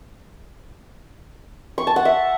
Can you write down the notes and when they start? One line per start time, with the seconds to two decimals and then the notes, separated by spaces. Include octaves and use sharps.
1.78 C#6
1.87 A5
1.96 F#5
2.05 E5